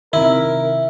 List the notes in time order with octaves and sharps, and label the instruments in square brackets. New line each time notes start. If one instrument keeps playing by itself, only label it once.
[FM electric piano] C3 D#3 [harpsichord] E4 [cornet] A#4 [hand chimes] E5